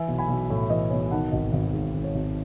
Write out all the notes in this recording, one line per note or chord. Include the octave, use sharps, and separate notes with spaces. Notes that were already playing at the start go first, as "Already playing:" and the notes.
Already playing: E3 E5 G#5
B1
G#5 B5
B1
A2
E3 D#5
B1 C#5
D#3 F#5 A5
G#1 D#5 F#5
G#1 D#5
G#2
D#3
C#5
G#1